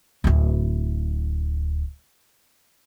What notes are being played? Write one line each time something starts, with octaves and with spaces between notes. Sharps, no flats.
D1 E4